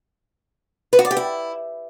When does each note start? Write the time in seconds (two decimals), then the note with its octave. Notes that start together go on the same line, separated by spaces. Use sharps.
0.93 B4
0.99 F#4
1.05 D5
1.11 G4
1.17 E4